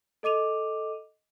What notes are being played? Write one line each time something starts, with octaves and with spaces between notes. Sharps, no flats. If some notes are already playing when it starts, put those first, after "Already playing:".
A4 D#5 D6 D#7 F7